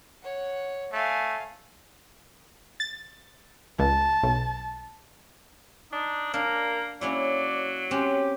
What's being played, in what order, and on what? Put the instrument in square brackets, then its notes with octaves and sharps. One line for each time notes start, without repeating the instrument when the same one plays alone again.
[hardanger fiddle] C#5 F#5
[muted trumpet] A3 [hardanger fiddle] F5 G#5
[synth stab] A6
[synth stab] C#2 [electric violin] A5
[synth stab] B1
[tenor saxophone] D4 [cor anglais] D#4
[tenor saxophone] A#3 [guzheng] D4 [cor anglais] A#4
[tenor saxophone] F#3 [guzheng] A#3 C#4 E4 [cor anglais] D5
[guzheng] C4 C#4 [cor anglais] G4